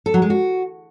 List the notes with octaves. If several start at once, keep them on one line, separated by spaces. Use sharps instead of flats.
A4
F#3
G#3
F#4